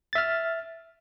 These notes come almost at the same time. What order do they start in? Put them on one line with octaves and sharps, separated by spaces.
A6 E5 F6